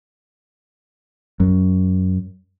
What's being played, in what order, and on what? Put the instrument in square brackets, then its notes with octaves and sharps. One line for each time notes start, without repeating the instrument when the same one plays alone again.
[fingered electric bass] F#2